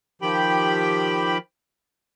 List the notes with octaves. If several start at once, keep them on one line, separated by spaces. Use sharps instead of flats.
D#3 F3 G4 G5 B5